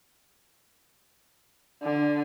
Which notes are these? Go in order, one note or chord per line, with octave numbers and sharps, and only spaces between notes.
D3